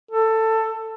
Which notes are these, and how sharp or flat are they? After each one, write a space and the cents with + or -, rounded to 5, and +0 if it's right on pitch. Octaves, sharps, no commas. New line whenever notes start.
A4 +15